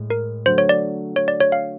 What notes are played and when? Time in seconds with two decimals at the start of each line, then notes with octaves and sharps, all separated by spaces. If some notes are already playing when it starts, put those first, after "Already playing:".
Already playing: A2 G#3
0.10 A#4
0.46 D3 F#3 A3 C5
0.58 C#5
0.69 D5
1.16 C#5
1.28 D5
1.40 C#5
1.52 F5